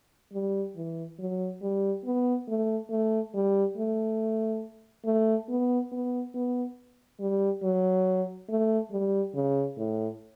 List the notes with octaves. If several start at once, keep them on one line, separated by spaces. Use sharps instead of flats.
G3
E3
F#3
G3
B3
A3
A3
G3
A3
A3
B3
B3
B3
G3
F#3
A3
G3
C#3
A2